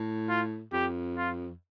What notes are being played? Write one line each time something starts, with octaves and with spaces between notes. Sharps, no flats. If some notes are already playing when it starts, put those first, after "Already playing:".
Already playing: A2
F4
F2 G4
F4